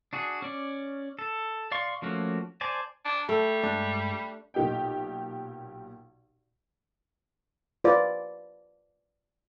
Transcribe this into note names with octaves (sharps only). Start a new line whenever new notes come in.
D4 F#4 G#4
C#4 D5
A4
D5 F5 C6 C#6
F3 A3 A#3 C#4 F#4
C5 D5 G#5 A5
D4
G3 A3 A4
G2 G#3 D4
B1 A#2 G4 D#5 G5
F4 B4 D5